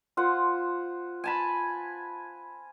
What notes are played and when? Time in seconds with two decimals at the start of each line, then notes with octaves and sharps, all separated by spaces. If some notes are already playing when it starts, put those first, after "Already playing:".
0.17 F4 C5 F#5
1.24 G#5 A5 B5